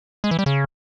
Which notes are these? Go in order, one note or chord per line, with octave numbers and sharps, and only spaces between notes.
G#3
E3
G3
C#3